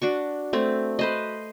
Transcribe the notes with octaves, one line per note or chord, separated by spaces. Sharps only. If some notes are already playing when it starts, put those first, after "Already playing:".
D4 F#4 C#6
A3 C4
B4 C5 D#5